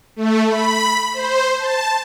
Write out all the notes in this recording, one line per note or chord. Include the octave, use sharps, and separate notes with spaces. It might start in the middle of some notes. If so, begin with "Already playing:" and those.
A3
B5
C5
A5